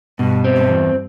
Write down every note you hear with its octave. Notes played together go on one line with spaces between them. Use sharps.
G2 B2
C4
G2
E2